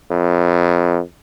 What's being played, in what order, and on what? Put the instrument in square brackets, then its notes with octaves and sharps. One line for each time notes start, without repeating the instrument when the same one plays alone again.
[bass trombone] F2